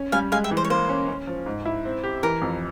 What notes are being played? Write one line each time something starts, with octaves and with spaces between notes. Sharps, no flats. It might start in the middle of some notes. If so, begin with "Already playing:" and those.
Already playing: C#4
G3 F5 G#5
G#3 F5 G#5
E5 G5
E3
C5
C#5
A#3 C5
C#4
C#4
F3
G#2
E4
C4
G4
E3 A#4
F2